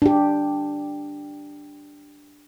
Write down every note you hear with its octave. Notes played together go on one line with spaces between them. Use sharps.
D4 G4